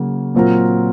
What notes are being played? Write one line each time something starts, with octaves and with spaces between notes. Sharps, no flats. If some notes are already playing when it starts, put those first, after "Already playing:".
Already playing: C#3 F#3 A#3
A#2 F#3 C4 F4 A#4